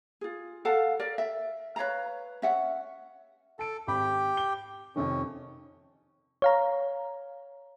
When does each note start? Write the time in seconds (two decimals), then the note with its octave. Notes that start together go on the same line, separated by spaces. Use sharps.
0.21 F4 G#4
0.65 A4 F5 F#5 A5
1.00 A#4 D5
1.18 E5
1.76 B4 C#5 F5 A#5
2.42 C#4 E5 F#5
3.59 A4 A5 D7
3.88 G#1 G4 G5 B5
4.37 G7
4.96 F2 C3 D#3 C#4
6.42 C#5 F5 A#5